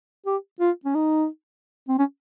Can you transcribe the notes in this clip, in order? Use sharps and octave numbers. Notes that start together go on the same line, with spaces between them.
G4
F4
C#4
D#4
C4
C#4